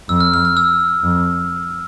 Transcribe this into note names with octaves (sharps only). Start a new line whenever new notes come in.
F2 E6
F6
F6
F6
E6
F2